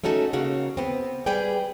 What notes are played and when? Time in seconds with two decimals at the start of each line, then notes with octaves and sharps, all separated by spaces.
0.04 A3 C#4 D#4 F#4 A4
0.33 C#3 A#3 F#4
0.77 B3 C4
1.26 G3 G#4 B4 D5 G5